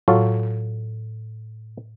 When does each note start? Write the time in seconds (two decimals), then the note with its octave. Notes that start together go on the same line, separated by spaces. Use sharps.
0.08 A2 F#3 F4 A4